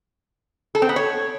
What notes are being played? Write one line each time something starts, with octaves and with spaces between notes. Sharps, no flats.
A4
C4
B3
C#5